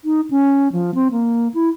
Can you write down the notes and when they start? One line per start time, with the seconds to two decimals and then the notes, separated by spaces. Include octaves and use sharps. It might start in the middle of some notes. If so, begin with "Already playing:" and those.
0.05 D#4
0.31 C#4
0.72 F3
0.95 C4
1.11 A#3
1.54 E4